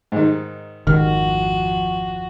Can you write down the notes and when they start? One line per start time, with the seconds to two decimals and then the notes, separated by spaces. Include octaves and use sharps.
0.12 G#2 D#3
0.87 G#1 F2 D#3 F#4 F6